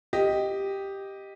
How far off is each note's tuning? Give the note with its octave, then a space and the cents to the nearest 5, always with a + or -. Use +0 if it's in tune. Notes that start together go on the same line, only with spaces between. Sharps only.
G4 +0 D#5 +0